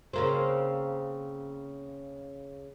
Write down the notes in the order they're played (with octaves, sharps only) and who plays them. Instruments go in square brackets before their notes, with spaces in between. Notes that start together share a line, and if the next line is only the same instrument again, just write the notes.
[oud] C#3 A#3 C4